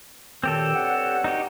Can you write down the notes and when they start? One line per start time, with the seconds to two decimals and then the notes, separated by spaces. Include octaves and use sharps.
0.44 F#2 A#2 D#3 C4 G4 A4
0.75 G2 C#5 F#5
1.24 D#4 F#4 G4